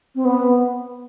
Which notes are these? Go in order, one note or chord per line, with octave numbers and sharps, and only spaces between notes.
C4
B3